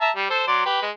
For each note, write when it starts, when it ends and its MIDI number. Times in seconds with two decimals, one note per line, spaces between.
0.01 0.11 76
0.01 0.11 81
0.01 0.11 82
0.16 0.29 55
0.30 0.45 69
0.30 0.45 72
0.47 0.64 54
0.47 0.64 74
0.47 0.64 84
0.66 0.82 67
0.66 0.82 71
0.82 0.90 56